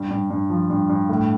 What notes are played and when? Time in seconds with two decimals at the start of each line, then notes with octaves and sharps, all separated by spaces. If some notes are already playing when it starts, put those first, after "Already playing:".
Already playing: G2
0.11 G2
0.30 G2
0.50 F3
0.70 G2
0.89 G2
1.09 A2